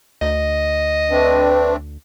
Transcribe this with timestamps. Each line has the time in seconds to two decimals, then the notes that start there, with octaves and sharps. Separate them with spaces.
0.21 D2 D#5
1.11 A3 C4 D4 B4